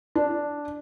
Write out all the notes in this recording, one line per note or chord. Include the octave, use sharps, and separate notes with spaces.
D4